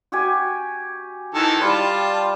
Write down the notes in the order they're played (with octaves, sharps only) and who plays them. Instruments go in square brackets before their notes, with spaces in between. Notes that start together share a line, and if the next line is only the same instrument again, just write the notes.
[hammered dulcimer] F#4 G4 G#5
[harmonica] D#3 E3 A4
[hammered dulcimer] G3 [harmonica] F4 A5